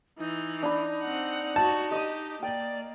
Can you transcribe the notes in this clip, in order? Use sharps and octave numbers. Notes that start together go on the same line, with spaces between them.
E3 D#4
D4 B5
C4 F#5
F#4 A5
G4 D#5 D#6
A#3 D5 G5